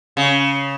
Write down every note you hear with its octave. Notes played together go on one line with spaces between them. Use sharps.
C#3